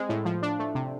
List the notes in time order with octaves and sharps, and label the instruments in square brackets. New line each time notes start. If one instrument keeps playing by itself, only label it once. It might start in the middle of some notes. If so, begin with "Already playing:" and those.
Already playing: [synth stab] G#3 C4
A2
F3
D4
A3
C3